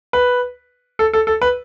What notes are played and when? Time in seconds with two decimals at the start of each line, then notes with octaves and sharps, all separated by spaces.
0.13 B4
0.99 A4
1.13 A4
1.27 A4
1.42 B4